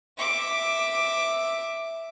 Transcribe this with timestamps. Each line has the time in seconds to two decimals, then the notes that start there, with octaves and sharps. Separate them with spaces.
0.18 E5 D6